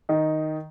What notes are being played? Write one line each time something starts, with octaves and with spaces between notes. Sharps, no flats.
D#3 D#4